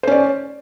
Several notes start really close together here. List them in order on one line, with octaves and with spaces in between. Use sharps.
C5 C#4 D5